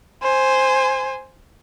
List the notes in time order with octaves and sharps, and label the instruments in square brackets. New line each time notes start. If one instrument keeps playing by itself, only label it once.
[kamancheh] C5 G#5